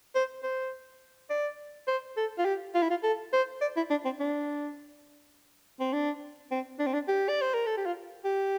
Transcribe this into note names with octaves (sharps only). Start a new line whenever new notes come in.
C5
C5
D5
C5
A4
F4
G4
F4
E4
F4
A4
C5
D5
E4
D4
C4
D4
C4
D4
C4
D4
C4
D4
G4
D5
C5
A#4
A4
G4
F4
G4